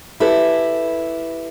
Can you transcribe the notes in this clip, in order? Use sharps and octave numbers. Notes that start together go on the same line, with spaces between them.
E4 G4 A4 B4